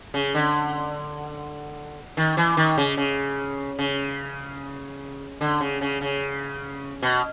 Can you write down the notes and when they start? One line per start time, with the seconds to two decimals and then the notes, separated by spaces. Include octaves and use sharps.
0.14 C#3
0.34 D3
2.17 D#3
2.37 E3
2.57 D#3
2.78 C#3
2.97 C#3
3.79 C#3
5.41 D3
5.61 C#3
5.81 C#3
6.01 C#3
7.02 B2